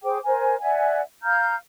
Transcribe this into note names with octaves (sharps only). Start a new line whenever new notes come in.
G#4 C5 G5 D6
A#4 C5 G#5
D5 E5 F#5 G#5
F5 A#5 F6 G6